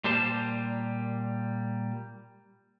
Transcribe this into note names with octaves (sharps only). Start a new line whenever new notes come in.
A#2 G3 G4 C5 A5